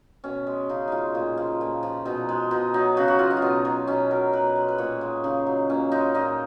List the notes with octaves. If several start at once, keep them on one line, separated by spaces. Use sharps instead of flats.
B2 C#4
G#3
C#3 D#4
G#3 D#4 F4
A#2
F3
A#2
F3
B2 D#4
G#3
B2 D#4
F#3 D#4
C#3 F#4
F#4
F#3 F4
D#4
F4
B2 D#4
F#3
B2 C#4
F#3 A#4
B2 B4
G#3
B4
A#2 C#5
G#3
C#3 D#4
F#3
A#2 C#4
G#3 D#4
A#2 D#4